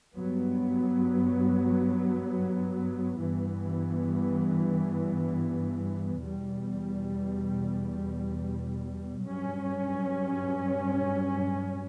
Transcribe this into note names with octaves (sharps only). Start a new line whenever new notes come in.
G2 F#3 B3
G2 E3 B3
E2 B2 G3
G2 F#3 C#4